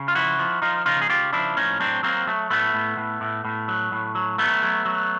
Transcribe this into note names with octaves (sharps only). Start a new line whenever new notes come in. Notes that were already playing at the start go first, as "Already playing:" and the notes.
Already playing: C#3
F4
F3 E4 F#4
F3
F3 D#4 F4
C#3 D#4 F4
G#4
C#3 F4 G4
F3 D4 E4
A2 C#4 D#4
F#3 C4 D4
F#3 A#3 C4
F#3 A3
A2 A3 B3
A2
A2
A2
A2
F#3
A2
F#3
F#3 A3 B3
F#3
F#3